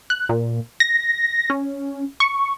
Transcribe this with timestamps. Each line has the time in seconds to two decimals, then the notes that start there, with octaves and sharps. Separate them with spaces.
0.10 F#6
0.29 A#2
0.80 A#6
1.50 C#4
2.20 C#6